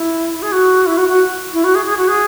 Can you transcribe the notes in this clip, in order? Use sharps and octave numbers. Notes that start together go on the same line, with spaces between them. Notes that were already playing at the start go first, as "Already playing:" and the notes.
Already playing: E4
G#4
F#4
E4
F#4
F#4
E4
F#4
G#4
G#4
F#4
G#4